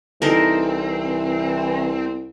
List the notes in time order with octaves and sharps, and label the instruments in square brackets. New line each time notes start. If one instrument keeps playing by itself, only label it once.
[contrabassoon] C2 [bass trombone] E3 [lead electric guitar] C4 [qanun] D#4 A4 A#4